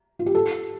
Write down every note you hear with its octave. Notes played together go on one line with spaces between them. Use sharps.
F4
G4
A4